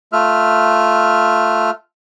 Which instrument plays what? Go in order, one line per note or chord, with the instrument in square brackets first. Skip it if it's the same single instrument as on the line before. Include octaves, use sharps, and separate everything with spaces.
[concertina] A3 F4 E5 F6